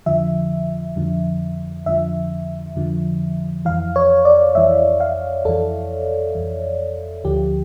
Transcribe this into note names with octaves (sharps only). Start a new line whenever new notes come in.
F2 D3 F3 E5
F2 D3 F3
F2 D3 F3 E5
F2 D3 F3
F2 E3 F5
C#5
D5
F2 E3 E5
F5
F2 E3 A4
F2 E3
D2 D3 F3 G4